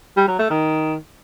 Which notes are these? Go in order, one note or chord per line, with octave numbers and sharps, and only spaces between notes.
G3
F#3
A3
D#3